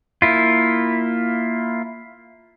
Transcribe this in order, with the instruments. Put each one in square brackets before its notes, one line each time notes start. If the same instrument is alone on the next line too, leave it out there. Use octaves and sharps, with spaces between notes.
[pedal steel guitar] A#3 E4 F4